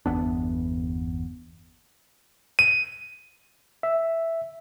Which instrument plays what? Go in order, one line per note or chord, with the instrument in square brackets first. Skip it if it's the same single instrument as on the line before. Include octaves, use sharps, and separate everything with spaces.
[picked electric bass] G1 E2 B3 D4
[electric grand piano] D#7
[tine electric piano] E5